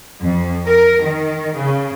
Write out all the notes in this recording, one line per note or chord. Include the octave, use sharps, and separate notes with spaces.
F2
A#4
D#3
C#3